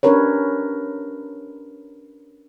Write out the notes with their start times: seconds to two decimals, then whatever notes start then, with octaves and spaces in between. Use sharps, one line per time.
0.03 C#4 D4 G4 A#4 B4 C#5